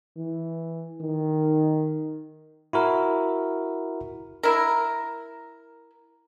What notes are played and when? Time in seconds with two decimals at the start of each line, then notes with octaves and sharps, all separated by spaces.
0.17 E3
1.01 D#3
2.73 E4 F#4 A#4
4.43 E4 A#4